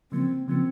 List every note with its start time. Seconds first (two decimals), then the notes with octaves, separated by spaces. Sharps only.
0.12 C#3 F3 A#3 C4
0.48 C#3 F3 A#3 C4